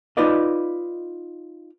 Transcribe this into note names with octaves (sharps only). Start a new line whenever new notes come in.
D#4 F4 B4 D5 D#5